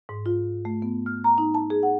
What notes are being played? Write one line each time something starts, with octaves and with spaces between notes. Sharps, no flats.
G#2
F4
A3
B3
F6
A#5
D#4
A5
G#4
F#5